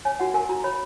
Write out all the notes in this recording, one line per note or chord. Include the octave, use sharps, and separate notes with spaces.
C#5 G#5
F#4 F#5
A#4 G#5
F#4 A#5
C#5 B5